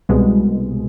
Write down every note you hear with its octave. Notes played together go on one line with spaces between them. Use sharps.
C2 B2 G#3